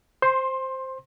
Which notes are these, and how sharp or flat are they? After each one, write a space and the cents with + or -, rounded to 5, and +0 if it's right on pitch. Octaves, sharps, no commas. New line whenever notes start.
C5 +0 C6 +20